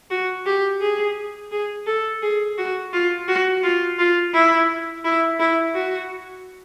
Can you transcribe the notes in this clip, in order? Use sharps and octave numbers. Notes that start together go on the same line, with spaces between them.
F#4
G4
G#4
G#4
A4
G#4
F#4
F4
F#4
F4
F4
E4
E4
E4
F#4